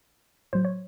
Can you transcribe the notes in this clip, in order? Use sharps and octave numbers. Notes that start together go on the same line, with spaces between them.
A2 F#3 C5
C#5